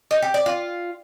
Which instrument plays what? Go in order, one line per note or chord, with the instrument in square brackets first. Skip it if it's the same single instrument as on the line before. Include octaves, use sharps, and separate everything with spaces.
[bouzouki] D#4
G4
D5
F4